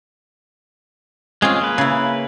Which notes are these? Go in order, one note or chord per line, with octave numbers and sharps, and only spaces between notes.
G#3 C4 C#4 F4 G#4
A#3 B4
C#3 E4